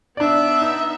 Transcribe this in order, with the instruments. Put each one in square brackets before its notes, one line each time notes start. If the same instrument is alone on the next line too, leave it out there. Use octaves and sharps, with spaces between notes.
[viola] B3 E5 [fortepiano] D4 D5
[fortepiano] D#4